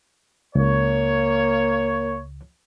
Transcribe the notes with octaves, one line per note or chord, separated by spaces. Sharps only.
C#2 A#3 C#5